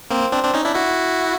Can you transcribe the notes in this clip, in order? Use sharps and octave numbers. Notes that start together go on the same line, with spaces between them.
A#3 C4
C4 D4
C4 D4
C#4 D#4
D4 E4
E4 F#4